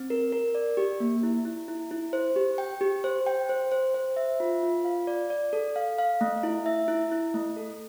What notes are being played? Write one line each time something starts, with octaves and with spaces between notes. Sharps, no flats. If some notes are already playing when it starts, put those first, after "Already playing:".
Already playing: C4
A#4
A#4
D5
G4
A#3
E4
E4
E4
E4
C5
G4
G5
G4
C5
G5
C5
C5
C5
E5
F4
F4
F5
D5
D5
A4
F5
F5
A3
E4
E5
E4
E4
A3
A4